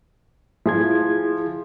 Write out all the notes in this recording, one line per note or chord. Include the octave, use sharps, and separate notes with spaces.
F3 E4 G#4 G#6